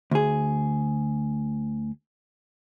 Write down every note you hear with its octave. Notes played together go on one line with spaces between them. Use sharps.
D2 G#4